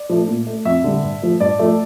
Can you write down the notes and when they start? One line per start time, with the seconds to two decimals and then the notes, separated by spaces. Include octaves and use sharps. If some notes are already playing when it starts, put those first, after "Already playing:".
Already playing: D5
0.09 F3 A3
0.28 A#2
0.47 A3
0.65 F2 E5
0.84 D3 G3
1.03 G2
1.22 F3 A3
1.40 G2 D5
1.59 F3 A3